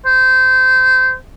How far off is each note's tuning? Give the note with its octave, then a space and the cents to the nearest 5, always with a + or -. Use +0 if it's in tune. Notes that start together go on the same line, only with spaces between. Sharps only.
C5 -25